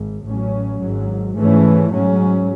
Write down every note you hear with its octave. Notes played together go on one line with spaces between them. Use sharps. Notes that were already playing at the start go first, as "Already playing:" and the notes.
Already playing: G#1 G#2
A1 A2 F#3 C#4
G#1 G#2 F#3
G#2 E3 A3 C#4
G#2 F#3 C#4